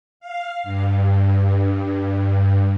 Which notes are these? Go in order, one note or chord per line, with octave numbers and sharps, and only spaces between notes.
F5
G2